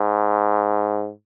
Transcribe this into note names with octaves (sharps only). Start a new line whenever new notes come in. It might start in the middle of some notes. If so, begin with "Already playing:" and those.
Already playing: G#2